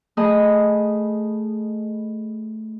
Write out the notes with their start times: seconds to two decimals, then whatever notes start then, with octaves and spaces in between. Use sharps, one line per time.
0.17 A3 G#4 D#5 B5